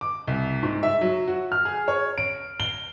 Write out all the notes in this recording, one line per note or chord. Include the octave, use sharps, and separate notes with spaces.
D6
C2
G#2
E5
F#3
F#4
F6
G#4
C#5
D7
G7